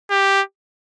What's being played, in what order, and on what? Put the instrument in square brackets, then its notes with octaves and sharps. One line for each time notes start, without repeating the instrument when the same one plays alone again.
[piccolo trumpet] G4